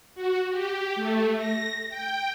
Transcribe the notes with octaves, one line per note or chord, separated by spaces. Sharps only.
F#4
G4
A3
A#6
G5